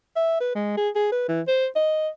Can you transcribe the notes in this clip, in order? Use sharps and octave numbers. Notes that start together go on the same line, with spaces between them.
E5
B4
G#3
G#4
G#4
B4
E3
C5
D#5